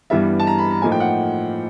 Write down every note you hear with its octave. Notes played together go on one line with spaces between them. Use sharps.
G2 E3 G3 B3 E5
A5
A#5
B5
A#5
A2 F3 A#3 D#4 G#5
G5
F#5